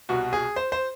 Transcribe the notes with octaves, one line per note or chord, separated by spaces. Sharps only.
C2 B2 F#4
G#4
C5
C5